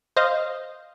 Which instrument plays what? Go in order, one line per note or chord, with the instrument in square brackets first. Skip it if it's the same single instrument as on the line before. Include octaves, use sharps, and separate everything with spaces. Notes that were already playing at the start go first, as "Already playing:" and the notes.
[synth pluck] C5 D#5 F5